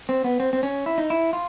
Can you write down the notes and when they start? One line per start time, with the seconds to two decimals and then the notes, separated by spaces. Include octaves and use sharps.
0.09 C4
0.24 B3
0.40 C4
0.53 C4
0.63 C#4
0.86 E4
0.98 D#4
1.10 E4
1.33 F4